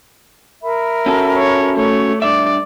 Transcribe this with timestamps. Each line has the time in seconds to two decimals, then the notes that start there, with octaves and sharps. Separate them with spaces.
0.63 A#4 E5 B5
1.06 C#4 F#4 A4
1.38 C#5
1.76 A3 C#5
2.22 G2 D5 E5